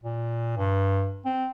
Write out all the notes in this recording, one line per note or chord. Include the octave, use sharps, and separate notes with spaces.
A#2
G2
C4